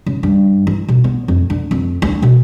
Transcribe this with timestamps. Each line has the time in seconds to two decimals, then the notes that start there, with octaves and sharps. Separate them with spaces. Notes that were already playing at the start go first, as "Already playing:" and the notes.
0.06 C#3
0.23 G2
0.67 E3
0.88 B2
1.04 B3
1.28 F2
1.50 D3
1.71 F2
2.02 D2
2.22 B2